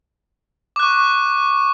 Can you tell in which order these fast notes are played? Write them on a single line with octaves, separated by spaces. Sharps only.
D6 F#6 C#6